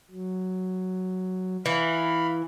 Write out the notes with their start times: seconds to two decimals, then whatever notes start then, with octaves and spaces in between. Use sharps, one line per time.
0.11 F#3
1.66 E3 F5 B5